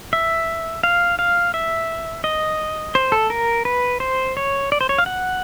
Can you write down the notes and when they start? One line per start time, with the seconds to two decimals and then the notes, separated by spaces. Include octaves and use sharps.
0.13 E5
0.83 F5
1.19 F5
1.54 E5
2.24 D#5
2.95 C5
3.12 A4
3.30 A#4
3.65 B4
4.00 C5
4.37 C#5
4.72 D5
4.81 C5
4.89 C#5
4.98 F5
5.06 F#5